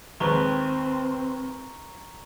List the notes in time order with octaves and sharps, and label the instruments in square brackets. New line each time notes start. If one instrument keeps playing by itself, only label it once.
[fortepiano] D#2 G#3 B4 [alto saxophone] C4 [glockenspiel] A#5 C#6 G7